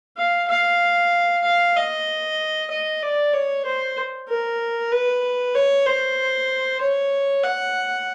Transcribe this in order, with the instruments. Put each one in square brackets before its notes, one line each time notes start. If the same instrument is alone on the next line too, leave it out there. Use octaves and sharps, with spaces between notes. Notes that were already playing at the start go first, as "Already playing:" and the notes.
[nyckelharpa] F5
F5
F5
D#5
D#5
D5
C#5
C5
A#4
B4
C#5
C5
C#5
F#5